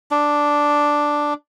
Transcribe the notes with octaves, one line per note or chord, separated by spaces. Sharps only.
D4